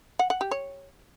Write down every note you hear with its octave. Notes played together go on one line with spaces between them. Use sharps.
F#5
F#5
G4
C#5